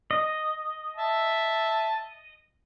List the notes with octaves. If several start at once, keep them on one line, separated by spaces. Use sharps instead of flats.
D#5
E5 A5